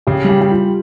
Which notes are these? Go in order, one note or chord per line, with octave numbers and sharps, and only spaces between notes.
C#3 G4
G3 G4
G3 G4
F4